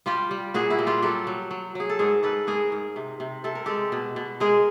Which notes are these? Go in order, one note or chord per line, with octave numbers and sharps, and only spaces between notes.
G3 F4 G4
G3
A#2 F#4 G#4
E4 F#4
G3
F4 G4
F#3 G4 A4
F#3
F#3
F#3 G#4
A4
G#2 G#4 A#4
G#2 A4 B4
G#2 G#4 A#4
G#2
C3
C3
C3 A4
A#4
G#3 G4 A4
B2
B2
G#3 G#4 A#4